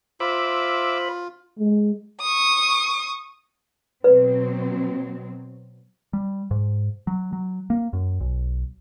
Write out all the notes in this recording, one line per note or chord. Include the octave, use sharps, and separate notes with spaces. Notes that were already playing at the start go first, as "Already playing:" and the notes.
F4 C5 E5 B5 D6
G#3
C#6 D#6
B2 F#3 C4 B4
G3
G#2
F#3
F#3
A#3
F#2
B1